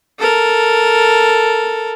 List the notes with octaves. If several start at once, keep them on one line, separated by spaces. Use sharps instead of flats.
A4 A#4